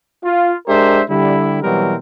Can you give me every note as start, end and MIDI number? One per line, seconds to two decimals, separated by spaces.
0.24 0.54 65
0.67 1.02 56
0.67 1.02 62
0.67 1.02 67
0.67 1.02 70
0.67 1.02 72
0.67 1.02 76
1.10 1.61 50
1.10 1.61 55
1.10 1.61 64
1.63 1.95 47
1.63 1.95 52
1.63 1.95 54
1.63 1.95 55
1.63 1.95 60
1.63 1.95 70